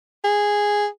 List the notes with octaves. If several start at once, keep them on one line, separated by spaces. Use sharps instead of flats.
G#4